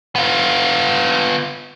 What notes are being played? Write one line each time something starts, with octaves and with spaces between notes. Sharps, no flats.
B3 F4